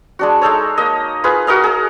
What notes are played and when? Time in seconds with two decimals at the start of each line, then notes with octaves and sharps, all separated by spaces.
0.19 G#3 D4 F#4
0.41 G#3 D#4 A4 C#5
0.78 A#3 D#5
1.24 F4 G#4 B4
1.47 F#4 A#4 D#5 F5
1.64 G#4 A#5